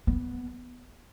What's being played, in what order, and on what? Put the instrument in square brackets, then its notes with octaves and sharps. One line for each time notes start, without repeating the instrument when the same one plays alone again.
[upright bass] B3